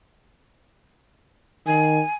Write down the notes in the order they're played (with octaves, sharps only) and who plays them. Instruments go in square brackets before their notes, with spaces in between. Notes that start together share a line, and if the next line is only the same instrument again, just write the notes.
[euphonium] D#3 [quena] G#5